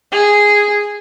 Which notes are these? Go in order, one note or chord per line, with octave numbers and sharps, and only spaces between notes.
G#4